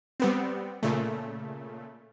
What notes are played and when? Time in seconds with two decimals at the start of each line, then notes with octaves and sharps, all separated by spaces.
0.20 G3 B3 C4
0.83 A#2 C#3 A3